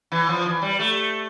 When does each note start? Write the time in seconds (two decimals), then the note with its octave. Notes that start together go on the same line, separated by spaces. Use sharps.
0.12 E3
0.29 F3
0.46 E3
0.62 G3
0.79 A3